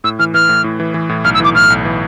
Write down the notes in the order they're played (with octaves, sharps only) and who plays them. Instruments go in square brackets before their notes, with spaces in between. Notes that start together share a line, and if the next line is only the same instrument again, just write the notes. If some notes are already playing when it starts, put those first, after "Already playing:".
[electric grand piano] A2 [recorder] E6
[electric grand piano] E3 [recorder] F6
[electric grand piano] E3 [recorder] F6
[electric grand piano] A2
A2
E3
E3
A2
[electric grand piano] B1 [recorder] F6
[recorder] E6
[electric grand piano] E3 [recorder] D6
[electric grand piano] A2 [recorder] F6
[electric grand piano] B1
E3